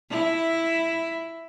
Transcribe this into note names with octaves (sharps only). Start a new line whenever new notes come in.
E4